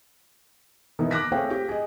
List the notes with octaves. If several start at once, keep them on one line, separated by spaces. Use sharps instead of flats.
B2 D#3 E3
D6 F#6 A#6 B6
A3 C4 G#4 C#5 F5 G5
G4
G#4 D#5